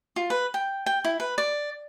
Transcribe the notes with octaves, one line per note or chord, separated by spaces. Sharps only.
F4
B4
G5
G5
E4
B4
D5